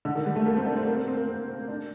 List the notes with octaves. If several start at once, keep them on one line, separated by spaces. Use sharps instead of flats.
D3
D#3
G3
A3
A#3
C4
D4
C4
A#3
C4
C4
A#3
C4
C4
D4